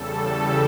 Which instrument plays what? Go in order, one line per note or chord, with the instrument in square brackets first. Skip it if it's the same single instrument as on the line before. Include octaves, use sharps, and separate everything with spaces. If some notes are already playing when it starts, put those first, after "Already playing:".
Already playing: [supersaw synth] E2 C#3 G3 A4
G4